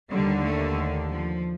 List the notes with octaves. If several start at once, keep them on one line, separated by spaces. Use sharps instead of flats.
D#2 D3 G3
A3
F3